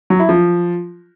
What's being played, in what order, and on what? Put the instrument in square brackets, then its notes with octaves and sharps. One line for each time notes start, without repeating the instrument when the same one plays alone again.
[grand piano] F#3
E4
F3